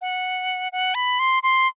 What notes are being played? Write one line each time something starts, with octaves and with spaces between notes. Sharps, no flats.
F#5
F#5
B5
C6
C6